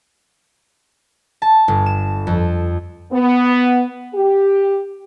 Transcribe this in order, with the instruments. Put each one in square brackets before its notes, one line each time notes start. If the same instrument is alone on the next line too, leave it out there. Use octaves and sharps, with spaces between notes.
[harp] A5
G1
E7
F2
[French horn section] B3
G4